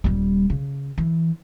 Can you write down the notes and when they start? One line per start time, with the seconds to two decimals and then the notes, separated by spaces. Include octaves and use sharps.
0.04 D#1 G3
0.50 C#3
0.98 E3